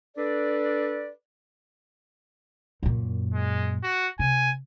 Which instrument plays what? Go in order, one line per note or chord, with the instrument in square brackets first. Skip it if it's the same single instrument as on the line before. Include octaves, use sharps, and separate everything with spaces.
[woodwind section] D4 A4 B4 D5
[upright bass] F#2 A#2
[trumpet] G#3
F#4
[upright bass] C3 [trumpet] G#5